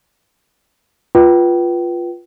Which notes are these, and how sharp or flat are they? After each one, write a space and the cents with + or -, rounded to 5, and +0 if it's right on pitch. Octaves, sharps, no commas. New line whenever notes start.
F4 +0 B4 -15 G5 -35